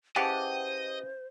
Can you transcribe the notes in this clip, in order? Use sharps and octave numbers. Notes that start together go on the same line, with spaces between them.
C#3 E3 G4 C5 D#5 F#5 A5